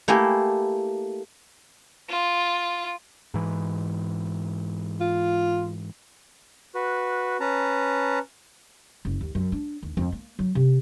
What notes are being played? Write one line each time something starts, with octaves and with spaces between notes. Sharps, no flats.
A3 A#3 E4 G4 G#5
F4
G#2 E3
F4
F#4 B4
C#4 B4 A5 A#5
F#1
D#2
F#2
D4
D#2
F2
A#3
F#3
C3